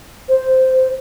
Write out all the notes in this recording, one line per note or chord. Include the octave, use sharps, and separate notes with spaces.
C5